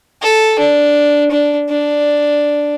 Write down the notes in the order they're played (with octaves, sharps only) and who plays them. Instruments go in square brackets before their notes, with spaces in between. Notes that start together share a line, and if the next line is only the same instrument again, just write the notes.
[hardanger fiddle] A4
D4
D4
D4